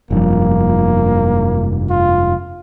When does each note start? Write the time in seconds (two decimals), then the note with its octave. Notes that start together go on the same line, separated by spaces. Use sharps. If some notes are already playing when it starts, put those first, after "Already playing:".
0.11 F1 G2 F3 A#3
1.90 F4